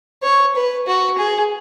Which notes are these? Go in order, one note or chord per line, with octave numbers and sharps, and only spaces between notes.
C#5
B4
F#4
G#4